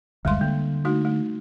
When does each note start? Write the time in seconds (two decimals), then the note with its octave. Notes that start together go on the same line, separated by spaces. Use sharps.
0.25 F#1 D2 G3 G#3 C6
0.41 D3 A#3
0.85 A3 D#4 F#4
1.05 A3